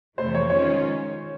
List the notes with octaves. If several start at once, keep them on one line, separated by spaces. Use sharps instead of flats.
F2 C3 E3 A3 C5
C#5
D#3 G#3 C#4 F4 C#5